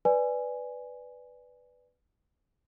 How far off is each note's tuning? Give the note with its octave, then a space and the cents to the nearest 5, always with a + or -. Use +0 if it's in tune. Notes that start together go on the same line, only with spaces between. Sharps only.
B4 +0 D5 +0 G#5 +0